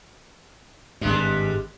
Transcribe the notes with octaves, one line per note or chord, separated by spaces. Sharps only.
G#1 G2 G3 G#3 D4